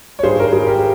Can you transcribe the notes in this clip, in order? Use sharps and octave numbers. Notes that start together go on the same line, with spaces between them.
C#5
G#1 G2 G3 G#4 C5
A#4
G#4
G4 A#4